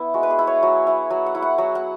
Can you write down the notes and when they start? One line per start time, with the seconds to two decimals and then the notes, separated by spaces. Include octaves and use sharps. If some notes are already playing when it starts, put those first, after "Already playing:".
Already playing: B3 E4
0.14 G#3 F#4
0.23 B4
0.30 G#4
0.39 E4
0.47 C#5
0.63 F#3
0.87 E4
1.10 F#3
1.26 F#5
1.35 E4
1.42 F#5
1.58 F#3
1.75 F#5